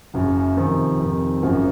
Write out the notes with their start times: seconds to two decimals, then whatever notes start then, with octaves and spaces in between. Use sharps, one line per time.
0.14 F#1 F#2 C#3
0.57 F1 F2 D#3
0.98 F1 F2 D#3
1.42 G#1 F#2 C#3 F3 A#3